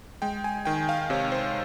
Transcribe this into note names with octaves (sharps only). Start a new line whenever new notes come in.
G#3 G5
G#5
D#3 G5
F5
C3 C#5
C5